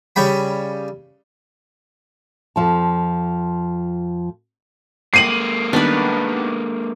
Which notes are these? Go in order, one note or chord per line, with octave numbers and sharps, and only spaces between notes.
C#3 G3 G5 B5
F2 F3 A5
G#3 A#3 C7 D#7 F#7
D#3 G3 B3 D4 B4